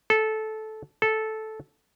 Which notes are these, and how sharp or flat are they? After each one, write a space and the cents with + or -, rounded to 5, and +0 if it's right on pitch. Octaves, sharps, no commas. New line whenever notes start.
A4 -15
A4 -10